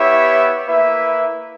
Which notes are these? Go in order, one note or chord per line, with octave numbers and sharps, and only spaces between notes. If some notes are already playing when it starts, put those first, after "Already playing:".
Already playing: B3 E4 G4 C#5 E5
A#3 E4 B4 E5